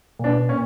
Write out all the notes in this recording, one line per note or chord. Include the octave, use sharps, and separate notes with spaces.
A#2
B2 D4
A#2 C#4